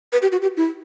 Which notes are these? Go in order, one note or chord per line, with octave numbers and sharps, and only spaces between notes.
B4
G4
F#4
G4
E4